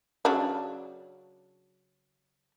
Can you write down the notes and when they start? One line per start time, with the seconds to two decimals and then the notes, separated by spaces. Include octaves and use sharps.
0.25 C#3 F#3 D4